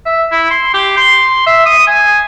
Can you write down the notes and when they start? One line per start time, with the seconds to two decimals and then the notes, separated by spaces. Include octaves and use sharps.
0.06 E5
0.31 E4
0.51 C6
0.74 G4
0.97 C6
1.46 E5
1.66 D#6
1.87 G#5